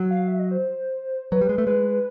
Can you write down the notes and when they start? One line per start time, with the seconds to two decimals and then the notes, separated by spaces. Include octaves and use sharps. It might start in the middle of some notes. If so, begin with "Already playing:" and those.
Already playing: F#3
0.11 F5
0.28 E5
0.39 D#5
0.51 C5
1.32 F#3 B4
1.41 G3
1.49 G#3
1.58 A3
1.67 G#3 B4